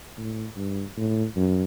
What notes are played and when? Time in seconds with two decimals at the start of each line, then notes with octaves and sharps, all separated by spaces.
0.18 A2
0.56 G2
0.97 A2
1.36 F#2